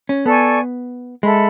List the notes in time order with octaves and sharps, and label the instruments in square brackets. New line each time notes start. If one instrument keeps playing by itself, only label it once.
[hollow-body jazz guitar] C#4
[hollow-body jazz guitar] B3 [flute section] A4 D5 G#5 C#6
[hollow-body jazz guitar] G#3 [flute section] A4 E5 B5